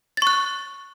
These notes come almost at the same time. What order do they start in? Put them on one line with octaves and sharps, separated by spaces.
A6 C#6 F#6